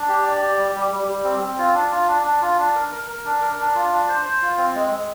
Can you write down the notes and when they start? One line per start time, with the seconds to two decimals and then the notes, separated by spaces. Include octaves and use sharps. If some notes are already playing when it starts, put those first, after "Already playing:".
Already playing: D4
0.08 G4
0.25 D5
0.42 G4
0.58 G3
0.75 G3
0.92 G3
1.08 G3
1.24 C4
1.41 C4
1.58 F4
1.74 D4
1.92 F4
2.08 D4
2.25 D4
2.42 F4
2.59 D4
2.75 A#4
2.92 A#4
3.08 A#4
3.25 D4
3.42 A#4
3.59 D4
3.75 F4
3.91 D4
4.09 C5
4.25 C5
4.42 F4
4.58 C4
4.75 G#3
4.92 G#3